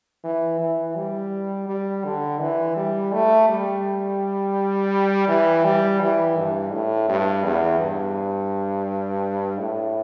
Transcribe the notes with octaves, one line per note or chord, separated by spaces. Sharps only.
E3
E3
G3
G3
D3
E3
G3
A3
G3
E3
G3
E3
G2
A2
G2
E2
G2
A2